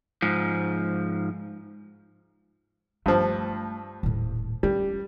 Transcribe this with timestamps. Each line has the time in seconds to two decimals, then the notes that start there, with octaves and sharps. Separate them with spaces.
0.22 G#2 F3
3.06 G2 F3 A3
4.03 D#1 A2
4.63 G3 C#4